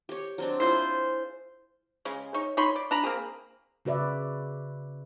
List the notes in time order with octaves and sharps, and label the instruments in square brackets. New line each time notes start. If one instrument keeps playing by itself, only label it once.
[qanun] G4 C#5
F#3 C4 D4
[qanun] E4 F4 G#4 [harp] C5 G6
[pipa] C#3 G#3
D#4 C#5
D#4 C#5 B5 C6
D5
D4 A#5 B5
A#3 C4 G#4
[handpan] C#3 F#4 B4 D5 E5